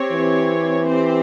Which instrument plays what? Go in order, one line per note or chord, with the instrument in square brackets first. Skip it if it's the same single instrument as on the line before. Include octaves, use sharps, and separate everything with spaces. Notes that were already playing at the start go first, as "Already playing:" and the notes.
Already playing: [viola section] C4 G4 C#5
[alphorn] E3
[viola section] C4 G4 C5